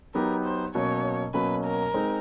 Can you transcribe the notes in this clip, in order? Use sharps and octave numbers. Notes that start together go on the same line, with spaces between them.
F#3 B3 D#4 G4 A#4
C5
B2 F#3 A#3 C#4 C#5
B2 F#3 A#3 C#4 B4
A#4
G#3 C4 D#4